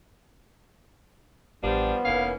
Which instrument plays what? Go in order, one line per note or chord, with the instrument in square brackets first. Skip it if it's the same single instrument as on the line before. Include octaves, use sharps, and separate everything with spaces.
[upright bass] A1 [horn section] F3 G3 [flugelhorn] B3 [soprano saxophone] D4
[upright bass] F1 D#4 [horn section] E3 A#3 C#4 [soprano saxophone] F5